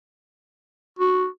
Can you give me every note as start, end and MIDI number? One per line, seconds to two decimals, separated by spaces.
0.99 1.26 66